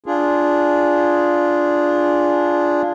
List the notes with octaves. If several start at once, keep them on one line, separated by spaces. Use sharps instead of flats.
D4 F4 G#4